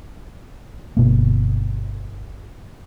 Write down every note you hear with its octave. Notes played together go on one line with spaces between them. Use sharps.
G1 B2 A#3